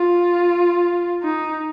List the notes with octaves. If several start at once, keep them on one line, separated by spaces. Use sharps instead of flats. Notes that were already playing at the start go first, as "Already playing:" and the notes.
Already playing: F4
D#4